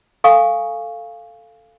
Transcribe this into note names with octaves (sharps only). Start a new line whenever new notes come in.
A4 F5 G#5 C#6 D#6